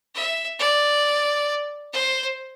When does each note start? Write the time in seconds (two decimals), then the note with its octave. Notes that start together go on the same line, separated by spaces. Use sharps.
0.15 E5
0.59 D5
1.93 C5